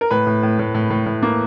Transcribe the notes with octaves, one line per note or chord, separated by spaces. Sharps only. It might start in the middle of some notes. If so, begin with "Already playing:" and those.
A#4
A2 B4
A2
A2
A2
A2
A2
A2
A#3